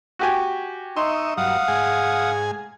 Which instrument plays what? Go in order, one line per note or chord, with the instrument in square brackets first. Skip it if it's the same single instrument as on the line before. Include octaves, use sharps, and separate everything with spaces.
[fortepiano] F#4 G4 G#5
[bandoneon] D#4 [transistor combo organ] D#5 E5 C#6 [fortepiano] C6
[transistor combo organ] G2 F#3 [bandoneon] F5 F#5 D#6
[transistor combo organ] G#2 G#4 G#5